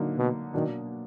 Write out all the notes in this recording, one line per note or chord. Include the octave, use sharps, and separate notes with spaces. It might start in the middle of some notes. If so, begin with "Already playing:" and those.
Already playing: D3 F#3 A#3 D#4
B2
B2 D#3 F#3 A#3 D4